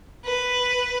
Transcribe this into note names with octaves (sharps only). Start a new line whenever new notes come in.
B4